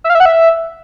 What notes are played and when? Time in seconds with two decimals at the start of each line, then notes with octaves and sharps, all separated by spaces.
0.04 E5
0.10 F5
0.15 E5
0.20 F#5
0.25 E5